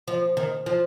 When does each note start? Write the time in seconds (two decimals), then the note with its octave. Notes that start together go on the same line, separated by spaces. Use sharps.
0.08 F3
0.37 D#3
0.66 F3